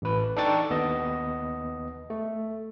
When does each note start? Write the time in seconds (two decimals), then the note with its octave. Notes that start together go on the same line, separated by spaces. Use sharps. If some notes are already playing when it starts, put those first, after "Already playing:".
0.02 A1 B4
0.36 D4 D#4 A4 G5 C#6 A6
0.70 D#2 B3 D#5
2.10 A3